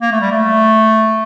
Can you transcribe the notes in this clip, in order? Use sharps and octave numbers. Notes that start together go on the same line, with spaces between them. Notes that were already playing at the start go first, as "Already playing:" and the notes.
A#3
A3
G3
A3